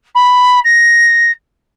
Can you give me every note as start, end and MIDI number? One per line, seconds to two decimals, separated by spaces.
0.15 0.59 83
0.64 1.31 94